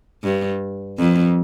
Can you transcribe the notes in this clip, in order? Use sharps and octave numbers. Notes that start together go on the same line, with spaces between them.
G2
F2